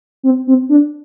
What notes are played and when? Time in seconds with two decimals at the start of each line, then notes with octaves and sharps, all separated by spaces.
0.23 C4
0.47 C4
0.69 D4